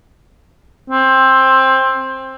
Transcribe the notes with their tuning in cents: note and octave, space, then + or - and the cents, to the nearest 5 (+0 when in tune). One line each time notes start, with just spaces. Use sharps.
C4 +15